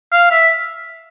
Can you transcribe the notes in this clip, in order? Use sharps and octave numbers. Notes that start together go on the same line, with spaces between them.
F5
E5